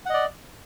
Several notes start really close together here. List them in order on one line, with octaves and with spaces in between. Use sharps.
F#5 D#5 D5